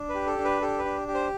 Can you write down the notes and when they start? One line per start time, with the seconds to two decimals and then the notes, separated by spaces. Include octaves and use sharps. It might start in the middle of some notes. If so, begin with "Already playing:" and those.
Already playing: D4
0.09 B4
0.14 G4
0.26 A4
0.38 D4
0.44 B4
0.61 G4 A4
0.78 B4
0.85 D4
1.08 G4
1.14 C5